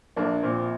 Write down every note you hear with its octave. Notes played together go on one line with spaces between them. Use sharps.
A#1 A#3 D4
A#2 C4